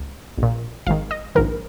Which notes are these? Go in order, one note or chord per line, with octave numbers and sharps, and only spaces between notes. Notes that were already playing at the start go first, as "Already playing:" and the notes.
Already playing: C#2
A#1
A#2
G#1 G#2 D#3 F5
D#5
A#1 G#2 D#3 A#4